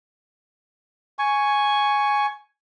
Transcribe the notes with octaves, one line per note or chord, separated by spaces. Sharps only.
G#5 C#6